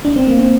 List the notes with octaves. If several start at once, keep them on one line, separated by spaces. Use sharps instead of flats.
D4
C4
A#3
C4